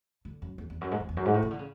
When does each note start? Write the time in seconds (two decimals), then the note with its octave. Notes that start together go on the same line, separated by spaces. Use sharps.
0.25 D3
0.42 F#2
0.58 E2
0.70 E2
0.81 F#2
0.91 G#2
1.00 F#2
1.09 E2
1.17 F#2
1.25 G#2
1.34 A2
1.42 C#3
1.51 D3
1.59 C#3